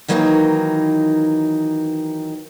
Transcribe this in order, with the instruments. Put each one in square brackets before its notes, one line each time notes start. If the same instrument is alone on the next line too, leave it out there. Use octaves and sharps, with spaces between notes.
[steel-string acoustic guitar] D#3 E3 F#3 A#3 C#4 D#4